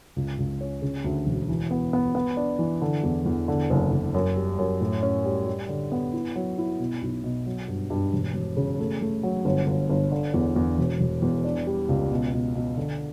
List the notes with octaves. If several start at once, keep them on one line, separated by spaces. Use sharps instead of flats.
C#2
C#2
C#4
C#3
D2
E1
E3
B3
B3
B3
D4
E3
D3
E2
E2
D3
F#1
F#1
F#2
G3
F#2
A2
C#4
G3
G3
D3
B3
E4
F#3
E4
B2
B1
B2
F#3
G2
G2
E1
E1
C#3
A3
A3
F#3
G1
G1
G1
D3
E2
E2
E1
E1
E2
D4
G3
C#2
B2
B2
B2
D3